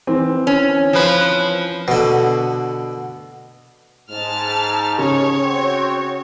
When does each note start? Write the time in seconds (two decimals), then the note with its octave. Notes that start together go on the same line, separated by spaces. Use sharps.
0.07 E3 C4
0.47 C#4
0.93 F3 B4
1.88 B2 D3
4.10 G#2 A5 F6
4.98 C#3 C#5
5.43 C4 F#4 G5